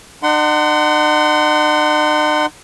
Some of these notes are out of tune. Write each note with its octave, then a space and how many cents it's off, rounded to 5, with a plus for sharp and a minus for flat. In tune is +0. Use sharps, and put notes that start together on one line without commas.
D#4 -45 F#5 +15 C6 -20